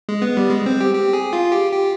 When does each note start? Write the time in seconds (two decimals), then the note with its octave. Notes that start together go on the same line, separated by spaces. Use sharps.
0.09 G#3
0.22 B3
0.37 G3
0.51 G#3
0.66 C4
0.81 G4
0.94 G4
1.13 G#4
1.33 F4
1.52 G4
1.72 G4